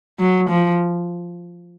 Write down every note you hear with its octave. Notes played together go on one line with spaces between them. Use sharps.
F#3
F3